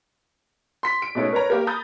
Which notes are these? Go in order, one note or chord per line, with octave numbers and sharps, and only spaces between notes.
C6 B6
D7
B2 G#3 A3 C#4 D#4
A#4 B4 C#5 A#5
A#3 G4 A#4
A#5 B5 D#6 G6 A6